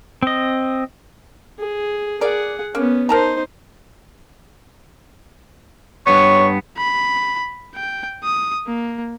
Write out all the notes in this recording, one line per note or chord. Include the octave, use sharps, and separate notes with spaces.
C4 D#5
G#4
G#4 A#4 D5 F#5
A#3 B3 C#4
D#4 A#4 C5 A5 A#5
G2 B3 C#5 C#6
B5
G5
D#6
A#3